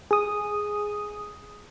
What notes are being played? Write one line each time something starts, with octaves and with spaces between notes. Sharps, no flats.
G#4 D#6